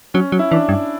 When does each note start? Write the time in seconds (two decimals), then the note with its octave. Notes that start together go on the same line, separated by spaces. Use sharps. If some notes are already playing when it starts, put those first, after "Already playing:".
0.14 F#3 C#4
0.32 F#3
0.39 E4
0.51 E3 D4
0.69 G2